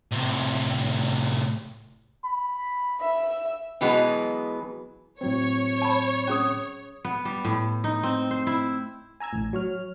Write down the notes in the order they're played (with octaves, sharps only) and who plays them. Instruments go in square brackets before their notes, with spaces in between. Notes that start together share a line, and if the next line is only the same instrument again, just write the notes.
[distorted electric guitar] A2 C3
[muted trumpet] B5
[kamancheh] E5
[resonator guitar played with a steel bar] B2 E3 F#3 G#3 B3
[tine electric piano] A2 F#3 C4 [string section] C#5
[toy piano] A5 B5
C#4 G#4 D#6
[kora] B3
G3
A2
D#4
C4
C5
E4
[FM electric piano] G#5 A#5 E6 G#6
A1 A2
F#3 C#5 F6